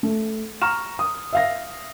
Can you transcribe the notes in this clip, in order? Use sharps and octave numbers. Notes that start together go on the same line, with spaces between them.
A3
A#5 C#6 F6 E7
D#6
E5 F5 A#6